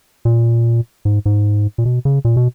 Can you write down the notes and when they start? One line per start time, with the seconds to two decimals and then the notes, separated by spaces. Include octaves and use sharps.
0.25 A#2
1.05 G#2
1.25 G#2
1.78 A#2
1.85 B2
2.05 C#3
2.25 A#2
2.37 B2